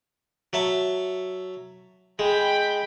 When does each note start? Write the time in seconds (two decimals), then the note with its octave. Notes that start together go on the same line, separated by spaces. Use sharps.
0.53 F#3 E5 A5
2.19 G#3 G5 B5